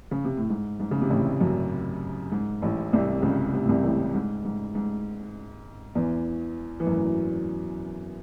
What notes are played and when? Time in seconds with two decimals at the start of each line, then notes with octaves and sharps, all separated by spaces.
0.11 C#3
0.25 C3
0.37 A2
0.50 G#2
0.80 G#2
0.91 C#3
1.01 C3
1.10 A1 A2
1.41 F#2
2.32 G#2
2.62 A1 A2
2.93 C2 C3
3.22 C#2 C#3
3.53 C3
3.61 A2
3.69 C2 C3
3.83 A1 A2
4.14 G#2
4.45 G#2
4.75 G#2
5.95 E2 E3
6.80 E3
6.87 F#2 F#3